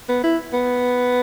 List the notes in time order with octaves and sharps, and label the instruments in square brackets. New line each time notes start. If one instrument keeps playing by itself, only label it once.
[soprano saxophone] B3
E4
B3